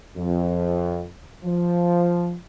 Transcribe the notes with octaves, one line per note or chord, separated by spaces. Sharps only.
F2
F3